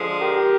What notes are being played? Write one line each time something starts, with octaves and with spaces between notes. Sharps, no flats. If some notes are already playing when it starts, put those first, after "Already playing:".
Already playing: D3 F3 G#3
G4 A#4